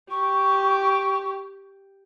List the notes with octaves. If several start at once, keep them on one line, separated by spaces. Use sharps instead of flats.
G4 C#6